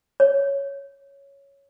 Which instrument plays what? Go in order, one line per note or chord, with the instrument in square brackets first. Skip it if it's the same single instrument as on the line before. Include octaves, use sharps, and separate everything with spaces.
[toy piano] C#5